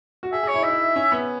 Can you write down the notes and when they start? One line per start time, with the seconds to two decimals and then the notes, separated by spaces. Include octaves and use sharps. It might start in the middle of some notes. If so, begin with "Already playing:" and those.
0.23 F#4
0.32 G#4 E5
0.43 G#4
0.48 C#5
0.54 E4
0.62 D#4 E5
0.70 E4
0.96 C#4
1.12 B3